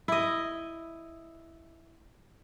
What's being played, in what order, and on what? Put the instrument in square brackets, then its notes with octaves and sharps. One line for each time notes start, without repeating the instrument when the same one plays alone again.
[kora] E4 D#5